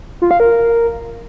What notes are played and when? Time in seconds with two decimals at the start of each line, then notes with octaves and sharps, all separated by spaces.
0.22 F4
0.31 F5
0.40 A#4